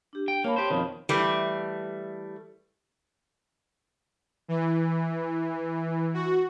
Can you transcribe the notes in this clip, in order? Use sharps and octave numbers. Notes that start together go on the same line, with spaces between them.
D4 G4
G5
A#3 C#5 A5 B5
G4 C5
F2 B2 D#3
E3 G3 A3
E3
F#4